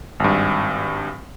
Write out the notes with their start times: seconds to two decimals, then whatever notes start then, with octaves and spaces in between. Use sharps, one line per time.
0.20 G#1 G2